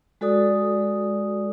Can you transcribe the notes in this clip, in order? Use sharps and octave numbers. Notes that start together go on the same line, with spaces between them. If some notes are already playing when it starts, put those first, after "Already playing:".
G#3 F#4 A4 D5 D#6